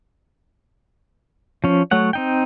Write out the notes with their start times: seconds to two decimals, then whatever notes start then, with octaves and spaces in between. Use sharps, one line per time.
1.64 F3 C#4
1.91 F#3 A3 C#5 F#5
2.13 C4 D#4 G5